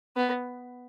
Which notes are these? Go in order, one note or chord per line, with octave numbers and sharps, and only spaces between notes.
B3